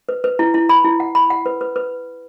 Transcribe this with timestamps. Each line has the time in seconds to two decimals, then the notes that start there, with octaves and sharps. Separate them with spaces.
0.09 B4
0.24 B4
0.39 E4
0.54 E4
0.69 B5
0.84 E4
1.00 F#5
1.15 B5
1.30 F#5
1.46 B4
1.61 B4
1.76 B4